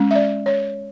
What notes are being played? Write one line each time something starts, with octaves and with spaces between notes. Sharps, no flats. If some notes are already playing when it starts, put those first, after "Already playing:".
Already playing: G#3 C#4
E5
D5
C#5